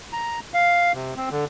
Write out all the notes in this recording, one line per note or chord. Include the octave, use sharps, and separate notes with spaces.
A#5
F5
C3
C4
D3